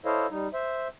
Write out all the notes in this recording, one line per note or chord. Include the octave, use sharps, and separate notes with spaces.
E4 A4 C5 C#5 D#5 F5
G3 D#4
C5 E5